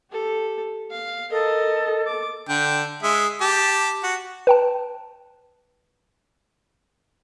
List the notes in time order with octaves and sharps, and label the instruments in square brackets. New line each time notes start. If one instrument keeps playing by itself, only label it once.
[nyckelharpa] G4 A4
F5
[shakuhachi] A4 [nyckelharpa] A#4 D#5
[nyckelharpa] D6
[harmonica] D3 G5
G#3 E5
G4 A5
F#4
[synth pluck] B4 G5 A5